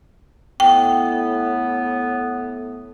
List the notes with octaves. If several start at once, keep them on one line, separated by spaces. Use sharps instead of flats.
A2 B3 G5